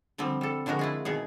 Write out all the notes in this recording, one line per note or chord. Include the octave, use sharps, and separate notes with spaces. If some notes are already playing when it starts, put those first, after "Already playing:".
D3 F3 G3 C4
G3 A4
D3 F3 G#3 F#4 A#4
E4 F4 G#4
B2 D#3 G#4